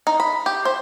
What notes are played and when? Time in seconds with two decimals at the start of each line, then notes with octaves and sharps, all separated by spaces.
0.07 D#4
0.20 B5
0.46 G4
0.65 C5